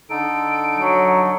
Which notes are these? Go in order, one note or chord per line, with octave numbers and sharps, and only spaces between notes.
D3 D#4 A4 D7
F#3